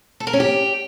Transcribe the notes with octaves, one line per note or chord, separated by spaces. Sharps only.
A4
A#4
C#4
G4